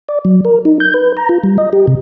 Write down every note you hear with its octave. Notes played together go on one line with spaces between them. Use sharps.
D5
F#3
A#4
D#4
G6
B4
A#5
F4
G3
D#5
G4
C3